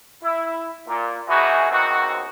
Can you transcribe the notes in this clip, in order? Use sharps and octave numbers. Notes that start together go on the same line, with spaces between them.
E4
A#2
B2 E3 B3 D#4 F#4 G#4
C#2 D#3 B3 C4 F#4